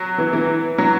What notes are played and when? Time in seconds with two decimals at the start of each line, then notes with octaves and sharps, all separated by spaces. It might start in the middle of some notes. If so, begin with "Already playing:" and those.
Already playing: F#3
0.18 E3
0.33 E3
0.78 F#3